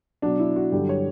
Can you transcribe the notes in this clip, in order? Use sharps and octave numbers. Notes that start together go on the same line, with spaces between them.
B2 F#3 D4
E4
F#4
G2 D3 F#3 G4
C#5